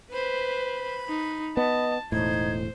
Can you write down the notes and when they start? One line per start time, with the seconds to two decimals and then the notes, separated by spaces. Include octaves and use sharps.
0.12 B4 C5 B5
1.09 D#4
1.57 B3 D#5 A5
2.12 E1 A2 D#4 C5 G#6